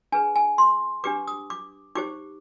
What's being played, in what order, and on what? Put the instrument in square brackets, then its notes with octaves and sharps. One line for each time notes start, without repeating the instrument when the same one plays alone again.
[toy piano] D4 G#4 B4 G#5
G#5
C6
D4 G4 B4 D6
D#6
D6
D#4 G4 C5 D6